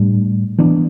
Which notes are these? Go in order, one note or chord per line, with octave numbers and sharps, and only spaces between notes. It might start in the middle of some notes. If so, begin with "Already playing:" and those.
Already playing: A2 G3 D4
E3 B3 D4